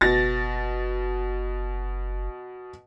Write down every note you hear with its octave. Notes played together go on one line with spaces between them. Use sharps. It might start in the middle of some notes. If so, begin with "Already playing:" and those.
F#1 B2 A6 A#6